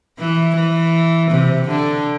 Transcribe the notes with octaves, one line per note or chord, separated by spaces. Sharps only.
E3
E3
C3
D3